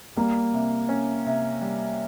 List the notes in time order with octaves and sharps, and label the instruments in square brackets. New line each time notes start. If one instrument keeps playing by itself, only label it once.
[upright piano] G3 [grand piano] A#3
[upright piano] C3
C#4
C3
G3